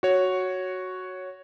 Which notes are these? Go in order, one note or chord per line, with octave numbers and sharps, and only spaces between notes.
F#4 C#5